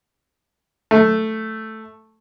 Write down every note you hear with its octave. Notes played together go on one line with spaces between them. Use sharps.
A3